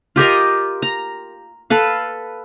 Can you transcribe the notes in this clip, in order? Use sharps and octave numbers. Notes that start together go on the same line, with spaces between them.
F4 G4 A#4 D#5
A#5
A4 B4 F5